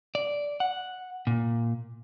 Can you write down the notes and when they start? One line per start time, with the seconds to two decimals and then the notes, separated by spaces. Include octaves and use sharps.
0.15 D5
0.60 F#5
1.27 A#2